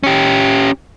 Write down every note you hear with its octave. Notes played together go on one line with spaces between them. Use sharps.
C#4 G4